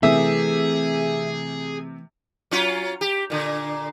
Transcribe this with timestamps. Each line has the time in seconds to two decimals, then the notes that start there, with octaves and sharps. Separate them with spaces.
0.03 C3 E3 A3 G#4 E5
2.51 F#3 C#4 F4
3.01 G4
3.30 A#2 D3